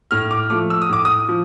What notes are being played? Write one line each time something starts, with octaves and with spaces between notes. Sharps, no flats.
A2 F6
D6
F3 A3 D6
E6
D#6
A2 D6
D#6
F3